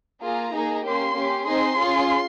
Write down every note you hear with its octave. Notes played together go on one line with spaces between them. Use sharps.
A#3 F4 G#4 A#5
A#3 D#4 G#4
A#3 C#4 G4 C6
C#4 G4
C4 D#4 G#4 C6
C#4 F4 G#4